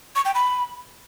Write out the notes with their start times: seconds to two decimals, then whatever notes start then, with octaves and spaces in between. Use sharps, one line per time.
0.15 C#6
0.25 G5
0.35 B5